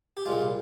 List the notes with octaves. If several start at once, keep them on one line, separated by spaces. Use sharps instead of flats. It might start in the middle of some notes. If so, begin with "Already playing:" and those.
G4
C2 A#2 G#3 F4